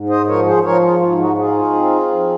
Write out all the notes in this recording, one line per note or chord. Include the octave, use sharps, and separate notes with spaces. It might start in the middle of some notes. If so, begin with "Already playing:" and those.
Already playing: G#2
C5 D#5
F3 A#4 C#5
G#4 C5
F3 A#4 C#5
F4
G#2 F4
D#4 F#4
D#4 F4 G#4
C4
F3